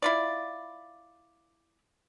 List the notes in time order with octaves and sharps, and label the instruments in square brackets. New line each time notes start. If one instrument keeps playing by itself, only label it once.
[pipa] E4 F4 D5